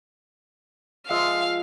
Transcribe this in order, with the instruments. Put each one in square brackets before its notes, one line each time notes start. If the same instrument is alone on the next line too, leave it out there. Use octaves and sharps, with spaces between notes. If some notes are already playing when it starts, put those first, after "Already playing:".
[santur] F3 G#3 E5 [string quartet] F5